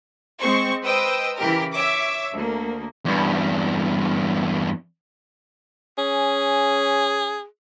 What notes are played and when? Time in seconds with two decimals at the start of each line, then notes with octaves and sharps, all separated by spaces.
0.40 G#3 C4 C5 C#6
0.86 B4 C5 D#5 G5 D#6 E6
1.39 C#3 E3 G4 A#4
1.73 C#5 E5 D6 E6
2.32 D2 A#3
3.05 E2 G2
5.98 C#4 G#4